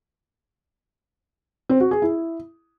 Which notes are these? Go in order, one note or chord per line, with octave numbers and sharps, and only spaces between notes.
C4
F#4
G#4
E4